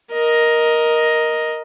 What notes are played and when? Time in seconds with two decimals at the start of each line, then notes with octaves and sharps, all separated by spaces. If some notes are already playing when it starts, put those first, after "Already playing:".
0.12 A#4 D#5